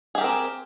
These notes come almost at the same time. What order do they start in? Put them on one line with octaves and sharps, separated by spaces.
G#4 G4 A#4 C4